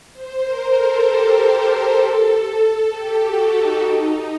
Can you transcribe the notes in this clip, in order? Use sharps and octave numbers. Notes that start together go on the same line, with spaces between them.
C5
A#4
A4
G4
G4
A4
G4
F#4
D#4
D#4